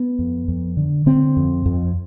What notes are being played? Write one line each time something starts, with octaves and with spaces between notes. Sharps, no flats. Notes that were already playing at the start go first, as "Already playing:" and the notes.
Already playing: B3
F2
F2
D3
D3 C4
F2
F2